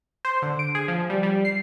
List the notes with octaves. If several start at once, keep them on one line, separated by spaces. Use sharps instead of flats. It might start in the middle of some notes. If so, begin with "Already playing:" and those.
C5
D3
D7
G#4
F3
G3
G3
C7